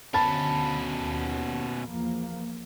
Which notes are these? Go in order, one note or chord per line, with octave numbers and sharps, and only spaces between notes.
D2 B2 C#4 A5 B5 A6
D#2
E2 F3 A#3